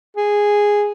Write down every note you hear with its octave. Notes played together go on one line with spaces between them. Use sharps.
G#4